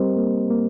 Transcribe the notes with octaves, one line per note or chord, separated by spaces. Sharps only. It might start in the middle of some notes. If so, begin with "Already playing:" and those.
Already playing: G3 C4 G4 A#4 C5 D#5
A#3
A#3